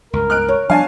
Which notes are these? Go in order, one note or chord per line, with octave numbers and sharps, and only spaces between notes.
C#2 G2 A#4
F6 F#6 D7
C#5
F3 G3 D4 F5 G#5 A5